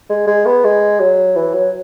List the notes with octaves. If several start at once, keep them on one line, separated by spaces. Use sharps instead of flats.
G#3
G#3
B3
G#3
F#3
E3
F#3